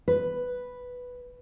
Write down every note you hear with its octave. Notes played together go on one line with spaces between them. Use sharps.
B4